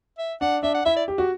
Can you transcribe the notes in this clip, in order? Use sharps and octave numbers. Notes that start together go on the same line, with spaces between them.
E5
D4 F#5
D4 E5
F#5
E4 E5
D5
G4
F#4